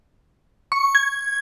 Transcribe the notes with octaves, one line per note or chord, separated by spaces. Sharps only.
C#6
G#6